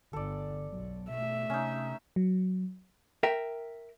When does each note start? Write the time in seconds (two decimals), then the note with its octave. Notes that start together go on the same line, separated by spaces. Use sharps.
0.13 G1 D3 A4 D5
0.72 B1 F#3
1.10 B2 A3 E5
1.50 C3 C#4 D#4
2.16 F#3
3.23 A#4 E5 G5